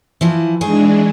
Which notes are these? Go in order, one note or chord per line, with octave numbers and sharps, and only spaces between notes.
E3 F3 E4
D#3 E3 G#3 D4 G#4